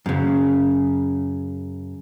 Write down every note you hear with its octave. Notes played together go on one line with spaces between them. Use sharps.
F#2 C#3